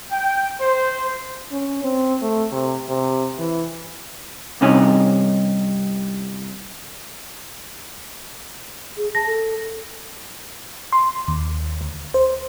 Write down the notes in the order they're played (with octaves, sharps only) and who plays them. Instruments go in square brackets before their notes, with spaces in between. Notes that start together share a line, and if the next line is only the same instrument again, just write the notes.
[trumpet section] G5
C5
[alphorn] C#4
C4
A3
C3
C3
E3
[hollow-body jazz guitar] C2 G2 C3 C#4 D#4 G#5
[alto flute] G#4
[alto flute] A5 [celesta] A#6
[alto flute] A4
[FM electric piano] C6
D#2
D2
C5